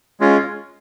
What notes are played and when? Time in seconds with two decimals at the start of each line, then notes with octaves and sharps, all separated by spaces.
0.20 G#3 C#4 F4